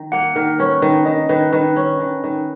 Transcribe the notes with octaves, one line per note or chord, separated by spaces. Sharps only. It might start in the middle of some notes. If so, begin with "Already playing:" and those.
Already playing: D#3
A#3 F#5
D#3 A#4
C#4 B4
D#3 B4
D#3 D#5
D#3 B4
D#3 B4
C#4
D#3
D#3